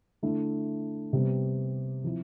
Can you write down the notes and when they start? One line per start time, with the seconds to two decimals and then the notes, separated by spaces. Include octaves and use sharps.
0.22 D3 A3 E4
1.13 C3 G3 B3
2.04 F3 C4 E4